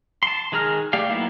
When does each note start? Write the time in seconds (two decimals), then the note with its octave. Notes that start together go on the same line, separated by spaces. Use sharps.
0.23 A5 C6
0.52 D#3 G#3 G#4 A#5 F6
0.93 A3 G4 D5 F5
1.10 F#3 A#3 B3 D#4 E4